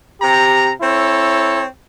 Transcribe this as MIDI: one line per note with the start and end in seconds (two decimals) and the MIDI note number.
0.22 0.71 48
0.22 0.71 67
0.22 0.71 82
0.81 1.65 60
0.81 1.65 64
0.81 1.65 69
0.81 1.65 73